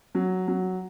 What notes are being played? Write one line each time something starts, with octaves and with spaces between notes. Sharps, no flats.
F#3
F#3